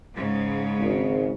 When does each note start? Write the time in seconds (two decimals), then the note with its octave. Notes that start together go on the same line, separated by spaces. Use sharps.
0.16 G#2 C#3
0.81 G#1